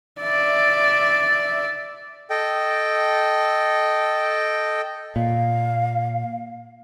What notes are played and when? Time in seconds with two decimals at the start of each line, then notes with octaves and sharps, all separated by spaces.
0.21 D5 E5
2.30 A4 D#5 G5
5.16 A#2 F5